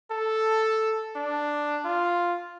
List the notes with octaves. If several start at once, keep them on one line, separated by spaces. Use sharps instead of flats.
A4
D4
F4